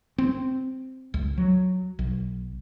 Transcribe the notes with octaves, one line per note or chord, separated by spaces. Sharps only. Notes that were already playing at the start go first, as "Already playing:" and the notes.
C4
C#2
F#3
B1